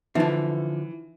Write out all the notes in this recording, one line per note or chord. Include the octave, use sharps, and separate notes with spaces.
D3 E3 F3 D#4 E5